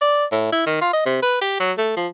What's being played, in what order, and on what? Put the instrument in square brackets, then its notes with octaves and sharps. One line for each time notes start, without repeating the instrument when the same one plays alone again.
[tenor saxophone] D5
A2
E4
D#3
F4
D#5
C3
B4
G4
F#3
A3
F3